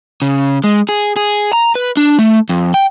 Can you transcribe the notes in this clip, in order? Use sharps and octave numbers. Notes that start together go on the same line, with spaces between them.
C#3
G#3
G#4
G#4
A#5
B4
D4
A3
F2
G5